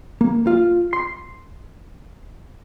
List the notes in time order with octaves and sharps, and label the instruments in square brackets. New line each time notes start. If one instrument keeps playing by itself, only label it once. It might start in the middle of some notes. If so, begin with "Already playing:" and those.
[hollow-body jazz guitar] A#3
F4
C6